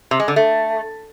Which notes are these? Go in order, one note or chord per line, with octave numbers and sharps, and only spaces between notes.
C3
G#3
D3
A3